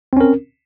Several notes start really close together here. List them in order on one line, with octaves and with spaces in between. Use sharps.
C4 C#4 A#4